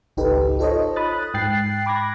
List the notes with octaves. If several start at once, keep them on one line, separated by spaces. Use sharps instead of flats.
G#1 C#2 D#4 G4 A4 B4
D#4 F4 A4 C5 C#5 D#5
B5 D#6 F#6 A6
G#2 G5 F#6 A6 C7
B5 D6 F#6 G#6 A#6